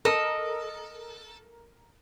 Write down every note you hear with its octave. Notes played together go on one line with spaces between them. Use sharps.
A4 A#4 D#5